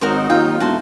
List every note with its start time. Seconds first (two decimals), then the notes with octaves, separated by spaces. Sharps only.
0.01 G#1 F#3 D#4 F#4 A#4 C5
0.30 D#2 F4 G5
0.60 E1 A3 F#4 A5 C6